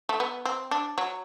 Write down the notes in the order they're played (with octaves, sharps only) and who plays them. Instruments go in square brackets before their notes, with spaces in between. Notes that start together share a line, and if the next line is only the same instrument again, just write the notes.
[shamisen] A3
B3
C4
D4
F#3